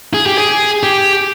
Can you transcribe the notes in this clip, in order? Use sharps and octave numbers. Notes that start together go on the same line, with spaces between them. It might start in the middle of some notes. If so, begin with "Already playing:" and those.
G#4
G4
G#4
G4